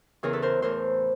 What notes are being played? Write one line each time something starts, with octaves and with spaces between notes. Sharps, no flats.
E2 C#3 E3 G#4 A#4
A4 B4
A#4 C5
A2 E3 A#4 C5